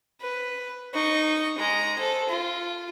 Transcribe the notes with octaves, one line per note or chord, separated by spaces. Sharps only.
B4
D#4 C#6
G#3 A#5
A4 C5
F4